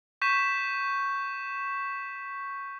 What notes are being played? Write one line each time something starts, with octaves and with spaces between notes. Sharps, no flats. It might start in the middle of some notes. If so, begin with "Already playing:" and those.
C#6 G6 B6 E7